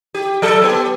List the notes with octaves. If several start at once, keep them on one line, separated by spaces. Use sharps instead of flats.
G4
F#3 A4
B3 G4